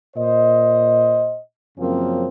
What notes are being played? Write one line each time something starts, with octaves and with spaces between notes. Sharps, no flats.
A#2 C5 D#5
F#2 C#3 F3 A#3 C4